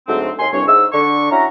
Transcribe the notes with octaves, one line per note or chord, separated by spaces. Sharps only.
D2 G#2 F#3 A3 C4
D#2 G#5 C6
C2 G2 C#5
G#2 E6
D3 D4 C#6
C#4 E4 F#4 A#5